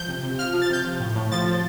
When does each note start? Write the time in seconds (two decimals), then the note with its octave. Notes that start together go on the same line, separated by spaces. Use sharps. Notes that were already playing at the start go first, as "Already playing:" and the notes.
Already playing: F3 G6
0.08 C3
0.23 C3
0.39 F3 F6
0.53 F3
0.62 A6
0.69 C3 G6
0.84 F3
1.00 A2
1.15 A2
1.32 F3 A6
1.46 F3